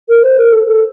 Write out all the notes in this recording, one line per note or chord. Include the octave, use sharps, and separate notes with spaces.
A#4
C5
A#4
A4
A4